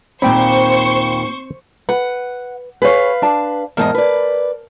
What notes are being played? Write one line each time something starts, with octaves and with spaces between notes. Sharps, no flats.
D#2 A#2 C4 C5 G5 B5 C#6
B4 F#5
G#4 B4 C#5 F5
D4 A5
E2 G#2 A#4 D#5 A5
B4 D5